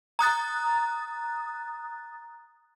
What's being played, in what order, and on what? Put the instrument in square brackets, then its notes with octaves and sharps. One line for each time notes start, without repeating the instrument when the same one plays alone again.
[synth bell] A#5 D#6 F#6 A6